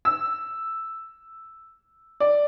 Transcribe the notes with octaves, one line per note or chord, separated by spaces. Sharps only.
E6
D5